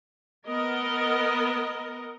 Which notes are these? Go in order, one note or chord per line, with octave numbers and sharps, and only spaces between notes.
B3 A#4 D#5